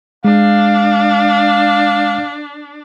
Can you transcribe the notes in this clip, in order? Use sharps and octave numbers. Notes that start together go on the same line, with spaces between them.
G#3 D4 F5